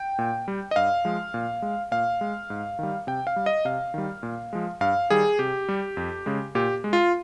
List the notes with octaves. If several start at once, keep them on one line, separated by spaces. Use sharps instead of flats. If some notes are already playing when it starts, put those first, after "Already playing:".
Already playing: G5
A#2
G3
D#5
G2 F5
F3 G#3
A#2
G#3
A#2 F5
G#3
G#2
D#3 G3
C3 G5
F5
G3
D#5
C3 F5
D#3 G3
A#2
F3 G#3
G2 F5
D#3 G3 G#4
C3 G4
G3
F2
C#3 G#3
A#2 G4
G#3
F4